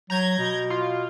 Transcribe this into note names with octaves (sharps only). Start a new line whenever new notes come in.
F#3 A#5 G6 G#6
B2
F4